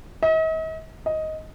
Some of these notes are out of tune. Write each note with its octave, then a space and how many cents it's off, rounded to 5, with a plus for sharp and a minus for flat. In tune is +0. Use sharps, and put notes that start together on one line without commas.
D#5 +45
D#5 +10